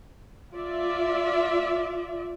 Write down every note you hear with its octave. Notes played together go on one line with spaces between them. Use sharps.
F4 D5 E5